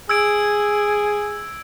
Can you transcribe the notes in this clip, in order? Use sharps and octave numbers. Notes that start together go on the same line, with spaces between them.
G#4 E6 G#6 D7